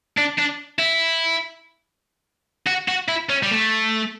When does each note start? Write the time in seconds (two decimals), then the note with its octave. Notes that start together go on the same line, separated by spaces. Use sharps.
0.17 D4
0.38 D4
0.79 E4
2.67 F#4
2.88 F#4
3.09 E4
3.30 C#4
3.43 G3
3.51 A3